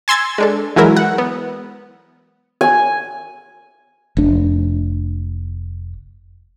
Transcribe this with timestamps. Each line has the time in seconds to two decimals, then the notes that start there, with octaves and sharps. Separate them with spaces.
0.08 G#5 C6 E6 G#6 A6
0.38 G#3 D4 A4
0.76 E3 F#3 G#3 E4 A#4
0.97 F#5
1.18 B3
2.61 G#5
4.17 F1 D4